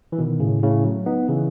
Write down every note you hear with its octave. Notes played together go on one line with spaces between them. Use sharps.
E3
B2 D#3
A2 C#3
A2 C#3
F#3 A3
B3 D#4
C#3 E3